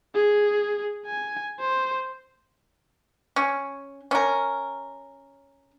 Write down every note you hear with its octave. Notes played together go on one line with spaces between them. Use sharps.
G#4
G#5
C5
C#4
C#4 A#4